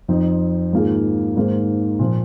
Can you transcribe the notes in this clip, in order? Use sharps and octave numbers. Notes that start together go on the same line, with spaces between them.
F2 F3 C4 D#4
G#2 D#3 A#3 F4 G#4
G#2 D#3 A#3 G#4 C5
A#2 F3 A#3